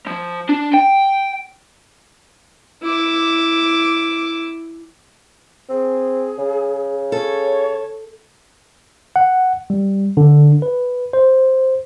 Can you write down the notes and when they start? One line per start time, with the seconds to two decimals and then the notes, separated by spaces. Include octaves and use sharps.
0.07 F3
0.49 D4
0.74 G5
2.83 E4 D6
5.69 C4 G#4
6.38 C#3
7.12 A4 C#5
9.16 F#5
9.70 G3
10.17 D3
10.62 B4
11.13 C5